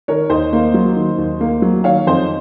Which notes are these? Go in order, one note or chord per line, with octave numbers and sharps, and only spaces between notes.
D#3 A#4 C#5
D#2 C5 D#5
A#3
F#3
D#3
D#2
A#3
F#3
D#3 C#5 F5
F2 C5 D#5